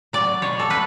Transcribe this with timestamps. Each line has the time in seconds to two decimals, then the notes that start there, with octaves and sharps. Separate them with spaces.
0.13 F#3 D5
0.42 B2 C#5
0.59 A4
0.70 A3 B4